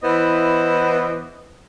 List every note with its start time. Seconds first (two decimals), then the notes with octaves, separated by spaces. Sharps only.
0.03 E3 B3 E4 C5 D#5